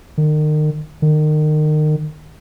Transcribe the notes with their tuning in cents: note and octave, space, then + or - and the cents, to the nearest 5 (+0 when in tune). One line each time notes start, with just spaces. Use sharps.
D#3 -35
D#3 -30